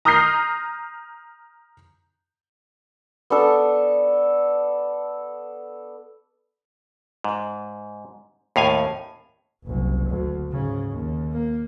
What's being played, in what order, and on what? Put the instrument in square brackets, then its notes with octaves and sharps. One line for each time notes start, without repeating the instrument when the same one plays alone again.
[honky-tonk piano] A#5 D#6 F6 G6 A#6 C7
[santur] B3 D4 A4
[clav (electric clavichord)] G#2
D#2 A2 F5 G#5
[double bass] F#1 C2
D2
G#2 C#3
D#2
A#3